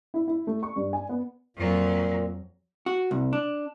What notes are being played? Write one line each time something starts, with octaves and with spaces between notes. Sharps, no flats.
E4
E4
A3
C#6
G2
G#5
B3
F2 A#2 F#3
F#4
C2
D4